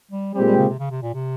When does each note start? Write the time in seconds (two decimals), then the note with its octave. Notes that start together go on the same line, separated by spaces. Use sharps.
0.11 G3
0.34 A#2 G3 G#3 C4 G4
0.46 G3
0.57 C#3
0.69 C3
0.79 C#3
0.91 C3
1.02 A#2
1.14 C3